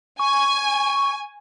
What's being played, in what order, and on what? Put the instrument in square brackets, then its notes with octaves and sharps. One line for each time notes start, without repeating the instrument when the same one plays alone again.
[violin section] G#5 [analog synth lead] C#6